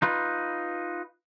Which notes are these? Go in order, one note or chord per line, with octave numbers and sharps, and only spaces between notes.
D#4 F4 B4